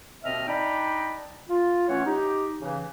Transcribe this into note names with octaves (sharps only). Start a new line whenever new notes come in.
D#2 B2 C4 D#5 E5 F6
D4 D#4 D5 D#5 G5 B5
F4
E3 A3 C#4 F4 C#5 F#5
D#4 G4
C#3 E3